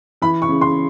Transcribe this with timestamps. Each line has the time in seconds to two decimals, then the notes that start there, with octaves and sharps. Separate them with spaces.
0.22 E3 B5
0.42 C#6
0.48 C#3
0.61 C6